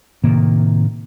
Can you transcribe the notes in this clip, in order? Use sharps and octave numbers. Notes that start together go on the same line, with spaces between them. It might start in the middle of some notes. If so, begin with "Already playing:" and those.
A2 C3 D#3 A#3